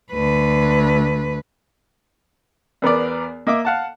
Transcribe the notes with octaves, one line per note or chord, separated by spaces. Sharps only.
D2 B4
E2 B3 A#4 D5
A#3 D#5 E5 D6
F5 F#5 A5